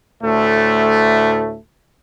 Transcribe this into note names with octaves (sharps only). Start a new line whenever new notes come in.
D2 A2 A3